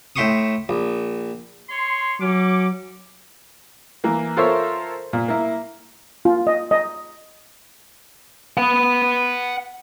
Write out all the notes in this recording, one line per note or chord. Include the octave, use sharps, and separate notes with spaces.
A2 E5 G5 C6 C#6 D#6
A#1
C#5 C6
F#3 C#4 D6
E3 A#3
F4 A4 A#4 C5 C#5 E5
A#2
A#3 E4
F4
D#5
D#5
F#5 B5